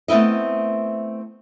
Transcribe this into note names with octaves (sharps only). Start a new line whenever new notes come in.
A3 B3 C4 E4 D#5